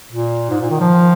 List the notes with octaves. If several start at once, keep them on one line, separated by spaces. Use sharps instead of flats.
A#2
G#2
A#2
D#3
F3